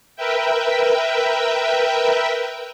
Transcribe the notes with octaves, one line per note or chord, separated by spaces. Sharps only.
A#4 B4 E5 G5